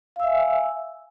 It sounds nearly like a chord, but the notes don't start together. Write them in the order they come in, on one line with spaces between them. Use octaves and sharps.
F5 E6 E5 G#5